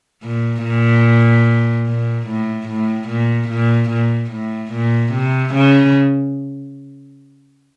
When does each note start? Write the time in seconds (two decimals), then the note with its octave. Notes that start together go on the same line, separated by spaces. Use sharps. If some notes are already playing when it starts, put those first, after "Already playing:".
0.23 A#2
0.63 A#2
1.87 A#2
2.27 A2
2.68 A2
3.08 A#2
3.49 A#2
3.90 A#2
4.31 A2
4.73 A#2
5.13 C3
5.54 C#3